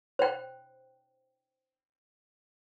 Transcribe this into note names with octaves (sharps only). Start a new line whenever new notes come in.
C5 G5